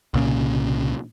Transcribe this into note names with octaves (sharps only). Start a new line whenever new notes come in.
C2 A#2 C#3